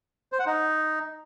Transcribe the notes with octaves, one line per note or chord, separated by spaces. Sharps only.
C5
F#5
D#4